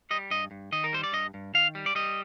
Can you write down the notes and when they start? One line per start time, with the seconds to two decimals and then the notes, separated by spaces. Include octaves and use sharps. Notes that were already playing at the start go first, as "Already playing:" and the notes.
0.11 G3 D#5
0.31 G2 D#5
0.51 G2
0.72 D#3 D#5
0.84 A#4
0.93 G3 C5
1.04 D5
1.12 G2 D#5
1.34 G2
1.54 D#3 F5
1.75 G3
1.86 D5
1.95 G3 D#5